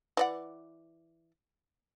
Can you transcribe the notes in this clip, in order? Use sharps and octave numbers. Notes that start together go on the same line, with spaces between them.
E3 D5 F#5